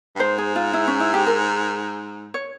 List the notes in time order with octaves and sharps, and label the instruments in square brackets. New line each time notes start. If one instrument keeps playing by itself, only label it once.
[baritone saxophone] G2
[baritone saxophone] G#2 [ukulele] C5
[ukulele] G#4
F4
E4
C#4
E4
G4
A#4
C#5